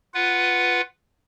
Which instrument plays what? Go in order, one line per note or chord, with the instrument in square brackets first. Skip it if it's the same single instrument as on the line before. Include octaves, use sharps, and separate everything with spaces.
[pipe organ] F4 B4 F#5